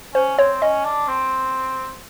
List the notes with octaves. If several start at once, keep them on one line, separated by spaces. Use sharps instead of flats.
C#4 C5
C4 C#5
C#4 D#5
D4
C4